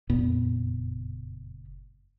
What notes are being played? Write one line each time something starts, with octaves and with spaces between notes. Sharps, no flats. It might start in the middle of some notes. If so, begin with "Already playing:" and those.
F#1 F2 A#2 B3